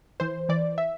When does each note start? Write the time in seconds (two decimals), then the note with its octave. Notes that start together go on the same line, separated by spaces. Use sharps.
0.20 E3 C5
0.49 E3 D5
0.78 E5